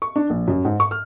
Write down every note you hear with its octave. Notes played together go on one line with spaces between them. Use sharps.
C#6
D4
A#1
F#2
G#2
C#6
F6